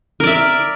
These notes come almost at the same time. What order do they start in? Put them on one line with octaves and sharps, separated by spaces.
A#4 D5 E5